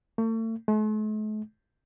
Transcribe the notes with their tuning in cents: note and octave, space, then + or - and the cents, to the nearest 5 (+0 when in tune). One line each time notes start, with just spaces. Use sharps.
A3 +40
A3 -45